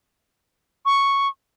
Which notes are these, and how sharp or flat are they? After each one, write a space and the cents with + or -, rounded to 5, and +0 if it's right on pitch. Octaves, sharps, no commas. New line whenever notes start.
C#6 +0